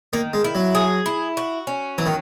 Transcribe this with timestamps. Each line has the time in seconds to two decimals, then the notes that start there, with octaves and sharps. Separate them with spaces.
0.13 D#3 A#3
0.33 G#3
0.44 E4
0.55 F#3
0.75 G#4
1.06 E4
1.37 F#4
1.67 C#4
1.98 E3 F#3
2.06 D#3